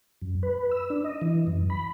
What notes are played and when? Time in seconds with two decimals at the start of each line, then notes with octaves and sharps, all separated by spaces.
0.22 F#2
0.43 B4
0.71 E6
0.90 D4
1.04 D#5
1.22 E3
1.47 F#2
1.70 B5